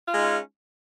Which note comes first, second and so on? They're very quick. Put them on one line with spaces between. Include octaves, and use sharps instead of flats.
F4 G#3 D#4 C#4